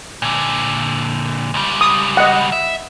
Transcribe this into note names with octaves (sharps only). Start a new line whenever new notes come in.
A#2 D3
C#2 G3
D#6
D#5 F#5
E5